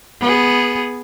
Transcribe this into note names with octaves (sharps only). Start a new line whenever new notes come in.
B3 G#4